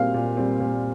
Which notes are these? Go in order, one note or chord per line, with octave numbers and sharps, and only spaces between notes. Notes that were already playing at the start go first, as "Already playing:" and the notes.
Already playing: A#2 G3 C4 F5
A#2
G3 C4
A#2